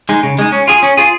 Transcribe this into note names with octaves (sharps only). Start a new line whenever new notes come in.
G#3 D#4
C#3
G#3 D#4
C#4
F4 G#4
C#4
F4 G#4